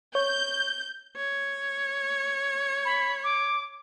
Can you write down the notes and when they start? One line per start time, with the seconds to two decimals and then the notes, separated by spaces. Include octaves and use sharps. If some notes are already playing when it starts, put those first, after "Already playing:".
0.15 C#5 G6
1.16 C#5
2.85 B5
3.24 D6